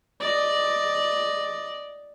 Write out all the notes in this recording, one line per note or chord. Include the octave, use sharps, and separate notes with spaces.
D5 D#5